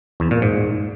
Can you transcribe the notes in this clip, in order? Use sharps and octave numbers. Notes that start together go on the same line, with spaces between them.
E2
A#2
G#2